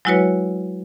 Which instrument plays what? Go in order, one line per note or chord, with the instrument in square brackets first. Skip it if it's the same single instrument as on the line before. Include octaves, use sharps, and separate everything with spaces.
[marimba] F#3 G#3 E4 F#4 B4 C#5